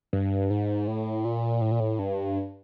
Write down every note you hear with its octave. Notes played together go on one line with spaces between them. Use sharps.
G2
G#2
A2
A#2
A2
A#2
A2
G2